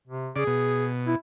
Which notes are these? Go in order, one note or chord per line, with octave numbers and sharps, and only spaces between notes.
C3
C#3 G#4 D5
B2
E4